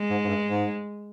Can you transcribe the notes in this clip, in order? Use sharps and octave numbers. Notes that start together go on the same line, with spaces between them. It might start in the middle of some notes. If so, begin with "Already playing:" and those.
Already playing: G#3
G#2
G#2
G2
G#2